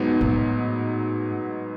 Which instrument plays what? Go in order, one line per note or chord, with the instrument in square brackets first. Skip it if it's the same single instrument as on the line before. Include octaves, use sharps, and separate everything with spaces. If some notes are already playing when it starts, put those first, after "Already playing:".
Already playing: [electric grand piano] G#2 F#3 B3 D#4
[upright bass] A2